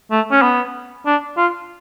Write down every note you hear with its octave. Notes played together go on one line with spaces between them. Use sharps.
A3
C#4
B3
D4
F4